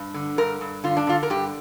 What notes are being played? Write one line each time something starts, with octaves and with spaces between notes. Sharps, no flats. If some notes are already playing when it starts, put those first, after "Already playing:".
Already playing: G2
D3
G2 A#4
G2
D3 F4
D4
D3 F4
A#4
G2 G4